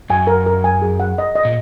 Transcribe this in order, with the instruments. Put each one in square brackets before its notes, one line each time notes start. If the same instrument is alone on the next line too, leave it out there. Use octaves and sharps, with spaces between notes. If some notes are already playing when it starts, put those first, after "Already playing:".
[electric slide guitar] F#2 [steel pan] G#5
[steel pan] A#4
A#4
G#5
G#4
F#5
D#5
D#5
[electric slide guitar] A#2